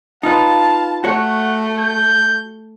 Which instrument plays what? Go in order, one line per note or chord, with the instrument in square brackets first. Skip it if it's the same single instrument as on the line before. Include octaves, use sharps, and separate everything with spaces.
[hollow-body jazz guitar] D#4 F4 B4 [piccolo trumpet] F5 [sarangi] A5
[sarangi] A3 [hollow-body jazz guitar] F#4 C#5 [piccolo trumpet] F#5
[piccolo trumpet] G6